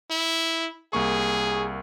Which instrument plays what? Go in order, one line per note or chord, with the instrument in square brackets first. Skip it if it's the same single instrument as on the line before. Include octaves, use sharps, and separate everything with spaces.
[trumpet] E4
[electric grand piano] C2 A#3 C#6 [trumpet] G#4